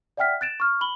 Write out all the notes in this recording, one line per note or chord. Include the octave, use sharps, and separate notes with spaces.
D5 E5 F#5 G5 F6 B6
F#6 A6 D7 E7
C#6 F6
B5 F#7 G7